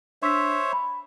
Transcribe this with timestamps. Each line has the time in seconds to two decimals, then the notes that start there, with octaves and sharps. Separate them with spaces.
0.22 D4 C5 C#5 E5 E6 B6
0.72 B5